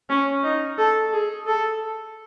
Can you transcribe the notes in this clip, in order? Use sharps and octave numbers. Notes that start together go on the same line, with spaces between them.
C#4
D#4
A4
G#4
A4